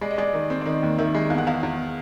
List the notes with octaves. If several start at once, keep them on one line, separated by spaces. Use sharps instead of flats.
G#3 D5
D#5
G#3 D5
D#3
C4
D5
D#3 D#5
D#2
D#3 E5
G#3
E2 F5
F#5
E2 F5
E2